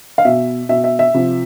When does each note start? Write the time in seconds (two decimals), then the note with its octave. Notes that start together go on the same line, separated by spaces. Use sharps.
0.18 F5
0.25 B2 E5
0.69 B2 E5
0.84 E5
0.99 E5
1.14 C3 F3